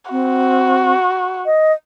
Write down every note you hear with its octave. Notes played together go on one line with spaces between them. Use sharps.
C4 F#4
D#5